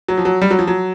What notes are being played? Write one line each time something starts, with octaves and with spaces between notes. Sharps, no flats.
F#3
F3
F#3
G3
F#3
F3
F#3